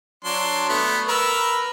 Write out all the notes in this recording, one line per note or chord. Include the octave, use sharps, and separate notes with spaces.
F#3 D4 C6
A3 B3
A#4 B4 E6